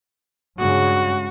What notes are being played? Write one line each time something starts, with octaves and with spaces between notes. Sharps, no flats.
G2 C#3 G#3 F#4